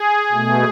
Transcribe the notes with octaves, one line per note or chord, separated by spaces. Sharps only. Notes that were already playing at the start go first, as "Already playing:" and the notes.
Already playing: G#4
B2 A3